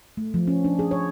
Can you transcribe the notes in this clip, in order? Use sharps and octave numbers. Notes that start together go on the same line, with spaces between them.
A3
F3
C#4
D4
G#4
C#5